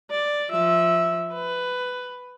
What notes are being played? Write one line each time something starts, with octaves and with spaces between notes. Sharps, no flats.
D5
F3 E5
B4